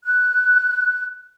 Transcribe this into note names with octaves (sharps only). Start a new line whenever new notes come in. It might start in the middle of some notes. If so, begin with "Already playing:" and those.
F#6